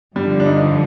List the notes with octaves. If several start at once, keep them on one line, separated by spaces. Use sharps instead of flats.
G2 D3 F3 G3
D4
D#4